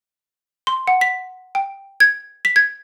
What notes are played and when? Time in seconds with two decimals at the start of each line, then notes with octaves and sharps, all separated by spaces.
0.67 C6
0.87 F#5
1.01 B6
1.55 G5
2.00 G#6
2.45 B6
2.56 G#6